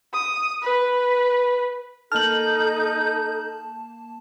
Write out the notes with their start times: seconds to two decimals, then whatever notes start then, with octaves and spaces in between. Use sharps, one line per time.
0.14 D#6
0.62 B4
2.12 A#3 D#4 A4 A5 F6 G6 F#7